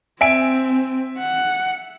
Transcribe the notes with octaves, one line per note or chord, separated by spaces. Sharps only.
C4 E5 G#5 D7
F#5